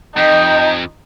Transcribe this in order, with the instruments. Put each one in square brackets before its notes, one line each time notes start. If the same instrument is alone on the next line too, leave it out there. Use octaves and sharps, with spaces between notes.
[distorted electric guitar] F2 [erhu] D#4 [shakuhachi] D#5 [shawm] G5